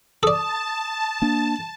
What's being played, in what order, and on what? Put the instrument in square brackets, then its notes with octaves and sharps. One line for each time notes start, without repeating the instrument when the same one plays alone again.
[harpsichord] A4 D5 [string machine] A5 [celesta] D#6
[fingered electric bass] A#3 D4